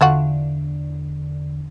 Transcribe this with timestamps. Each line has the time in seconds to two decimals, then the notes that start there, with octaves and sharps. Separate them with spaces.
0.01 E2 D3 A3 F4 F#4